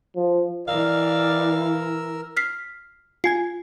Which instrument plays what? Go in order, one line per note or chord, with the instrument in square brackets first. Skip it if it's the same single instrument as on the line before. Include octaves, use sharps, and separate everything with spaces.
[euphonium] F3
[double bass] E3 [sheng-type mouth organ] A#4 E6 [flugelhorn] D5 [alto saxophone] F5
[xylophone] F6 B6 C7
[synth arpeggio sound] F4 G#5 G#6 [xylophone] C7